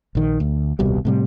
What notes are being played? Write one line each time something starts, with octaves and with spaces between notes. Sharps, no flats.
A#1 D#3
D2
D#1 C2 B2 G3
A2 C3 G3